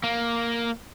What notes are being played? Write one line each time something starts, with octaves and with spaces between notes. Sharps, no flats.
A#3